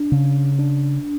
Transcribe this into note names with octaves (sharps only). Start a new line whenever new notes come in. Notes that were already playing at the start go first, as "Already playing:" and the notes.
Already playing: D4
C#3
D4